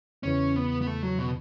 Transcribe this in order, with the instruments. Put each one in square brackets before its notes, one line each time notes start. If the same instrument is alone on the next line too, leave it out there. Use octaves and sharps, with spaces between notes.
[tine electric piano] E2 C#3 E3 [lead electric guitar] C#4
[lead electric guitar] B3
B3
A3
F#3
B2